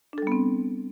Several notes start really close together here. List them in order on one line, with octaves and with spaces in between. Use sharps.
D4 A4 G3 B3 C4